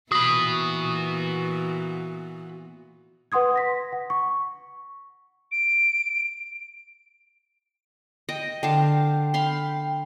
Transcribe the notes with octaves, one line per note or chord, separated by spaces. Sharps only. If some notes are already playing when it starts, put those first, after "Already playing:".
A#2 E3 B3 F#4 B5 D#6
B4 F#5 C6 D#6 G#6
C6 A#6 B6
F#5
C#6
D7
D#5 G5 A#6
D3 F5 G5 A5
F5 B5 C6